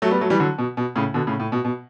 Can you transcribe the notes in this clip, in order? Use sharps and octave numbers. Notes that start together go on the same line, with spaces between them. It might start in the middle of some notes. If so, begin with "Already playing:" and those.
F#3 A3
G3 B3
F#3 A3
E3 G3
D3 F#3
B2
B2
A2 C#3
B2 D3
A2 C#3
A2
B2
B2